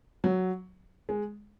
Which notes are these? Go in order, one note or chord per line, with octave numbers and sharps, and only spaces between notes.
F#3
G#3